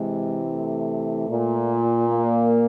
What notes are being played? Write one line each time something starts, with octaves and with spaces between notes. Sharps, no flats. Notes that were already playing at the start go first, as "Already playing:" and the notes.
Already playing: C3 E3 G#3
A3
A#2
A#3